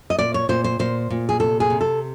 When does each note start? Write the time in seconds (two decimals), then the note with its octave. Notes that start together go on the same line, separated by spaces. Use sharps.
0.10 D#5
0.18 A#2 D5
0.34 C#5
0.49 A#2 C5
0.64 C5
0.79 A#2 C5
1.10 A#2
1.29 G#4
1.40 C3 A4
1.60 G#4
1.70 C3
1.81 A4